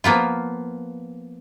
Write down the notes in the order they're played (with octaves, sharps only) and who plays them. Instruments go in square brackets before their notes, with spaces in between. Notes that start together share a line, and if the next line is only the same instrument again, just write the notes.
[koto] F3 A#3 B3 F4